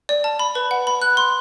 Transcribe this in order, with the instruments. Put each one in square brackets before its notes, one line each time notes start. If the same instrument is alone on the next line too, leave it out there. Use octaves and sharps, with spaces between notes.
[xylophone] D5
A5
B5
B4
F#5
B5
F#6
C6